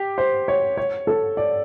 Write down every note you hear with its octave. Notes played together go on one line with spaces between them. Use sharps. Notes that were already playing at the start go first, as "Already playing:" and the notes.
Already playing: G4
C5
C#5
C#5
A4
D5